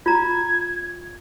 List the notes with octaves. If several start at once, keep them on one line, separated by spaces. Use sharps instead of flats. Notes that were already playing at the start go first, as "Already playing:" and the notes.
F4 A#5 G#6